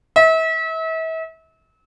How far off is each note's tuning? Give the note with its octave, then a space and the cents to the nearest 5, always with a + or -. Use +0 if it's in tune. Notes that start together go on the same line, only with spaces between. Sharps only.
E5 -35